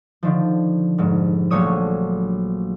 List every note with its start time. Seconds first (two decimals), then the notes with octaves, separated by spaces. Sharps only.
0.23 D3 D#3 F3
0.98 F1 G#2
1.50 A#1 F#3 A3 C#5 D#6 D#7